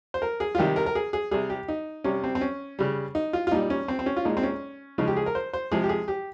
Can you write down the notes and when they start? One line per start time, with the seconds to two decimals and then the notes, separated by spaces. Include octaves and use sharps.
0.14 C5
0.22 A#4
0.40 G#4
0.55 F4
0.58 C3 D#3 G3 G4
0.76 A#4
0.86 A#4
0.95 G#4
1.13 G#4
1.31 C3 G3 G#4
1.50 G4
1.68 D#4
2.04 C3 G3 C#4
2.24 C4
2.35 C4
2.41 C#4
2.79 C#3 G3
3.15 D#4
3.33 F4
3.47 F4
3.51 A#2 G3 D#4
3.70 C#4
3.88 C4
3.99 C4
4.06 C#4
4.17 F4
4.25 A#2 G#3 D#4
4.37 C4
4.43 C#4
4.98 C#3 F3 G#3 D#4
5.07 G4
5.17 G#4
5.26 A#4
5.35 C5
5.53 C5
5.71 C3 F3 G#3 G#4
5.84 G4
5.89 G#4
6.08 G4